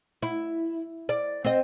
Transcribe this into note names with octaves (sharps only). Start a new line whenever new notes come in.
E4
D5
C4 D#5